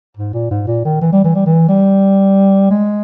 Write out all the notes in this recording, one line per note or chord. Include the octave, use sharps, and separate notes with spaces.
G#2
A#2
G#2
A#2
D#3
E3
G3
E3
G3
E3
G3
G#3